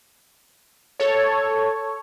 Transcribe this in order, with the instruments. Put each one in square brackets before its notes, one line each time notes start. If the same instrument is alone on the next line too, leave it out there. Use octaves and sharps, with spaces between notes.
[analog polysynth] A4 C#5